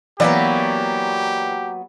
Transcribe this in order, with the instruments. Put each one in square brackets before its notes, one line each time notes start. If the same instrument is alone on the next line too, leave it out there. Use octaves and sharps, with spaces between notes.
[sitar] E3 D5 [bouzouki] F#3 A#3 B3 [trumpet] G4